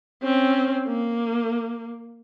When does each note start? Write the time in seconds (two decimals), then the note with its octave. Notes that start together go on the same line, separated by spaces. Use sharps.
0.23 C4 C#4
0.88 A#3